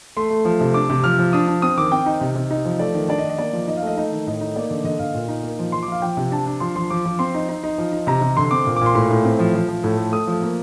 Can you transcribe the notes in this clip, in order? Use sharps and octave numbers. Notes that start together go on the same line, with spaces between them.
A3 C6
A3
F3
C3
D4 D6
C3
F3 F6
F3
D4 D#6
D4
C4 D#6
D#3 D6
C4 G5
D#4
C3
C3
D#4
F3
A3 D5
D#3
D4 D5
D#5
D#3
D#5
A#3 D5
F3
D#4 D#5
F5
A3 D#5
D#4 D#5
D#3
A2 D#5
D#4
A#3 D5
D3
D3 D#5
D3 F5
A#2
D#4
A#3
F3
F3 C6
D6
F3 F5
F3 G5
C3
D4 A5
D4
F3 C6
F3 C6
F3 D6
F3
C4 C6
D#4
D#4
D#4
F3
D#4
C3 A#5
C3
D3 C6
C4 D6
A#2
D6
A#2 C6
A2 C6
A2
C4
F3
F3
F3
A2
A3
A3 D#6
F3
A#3